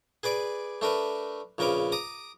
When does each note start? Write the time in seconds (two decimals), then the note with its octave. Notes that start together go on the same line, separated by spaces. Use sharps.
0.23 G#4 B4 D5 D6
0.81 A3 D4 A#4 B4
1.58 A#1 C#3 A#4 B4 D6
1.92 A#5 D6 D#6